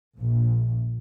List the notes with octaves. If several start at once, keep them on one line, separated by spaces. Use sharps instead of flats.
A#1